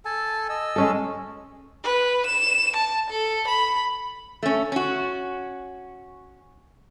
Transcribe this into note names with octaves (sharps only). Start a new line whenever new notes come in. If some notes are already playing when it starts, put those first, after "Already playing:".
A4 G#5 A5
D#5 E6
G#3 C#4 A4
B4
E7
A5
A4
B5
A3 C#4
C#4 F#4